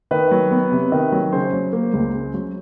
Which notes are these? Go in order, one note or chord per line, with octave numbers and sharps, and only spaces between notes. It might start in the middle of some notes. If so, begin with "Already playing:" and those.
D#3 B4
F#3
B3
C3
D#3
F#3
C#3 C5
F#3
A#3
C#2
C#3
F#3